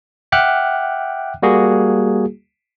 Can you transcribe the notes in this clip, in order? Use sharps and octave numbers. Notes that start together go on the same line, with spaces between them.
E5 F#5 G5 D6 F6 F#6
G3 A#3 F#4 G#4